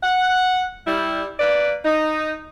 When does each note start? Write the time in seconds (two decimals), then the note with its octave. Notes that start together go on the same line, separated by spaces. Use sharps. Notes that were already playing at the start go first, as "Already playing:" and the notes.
0.03 F#5
0.86 G3 E4
1.38 A#3 B4 D5
1.85 D#4